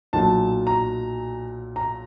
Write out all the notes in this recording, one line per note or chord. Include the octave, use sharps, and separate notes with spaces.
B1 A#2 F#3 A5
A#5
A#5